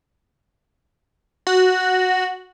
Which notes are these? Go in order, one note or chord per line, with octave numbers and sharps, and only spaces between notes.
F#4